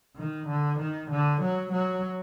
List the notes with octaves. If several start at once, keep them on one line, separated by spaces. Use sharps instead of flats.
D#3
D3
D#3
D3
F#3
F#3